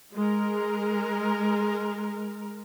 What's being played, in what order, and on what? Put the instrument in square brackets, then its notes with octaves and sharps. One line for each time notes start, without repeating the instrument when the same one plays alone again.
[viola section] G#3 A#4